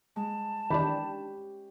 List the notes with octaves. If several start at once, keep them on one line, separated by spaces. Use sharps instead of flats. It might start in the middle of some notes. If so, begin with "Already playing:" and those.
G#3 A5
D#3 E3 C#4 D4 G4 B5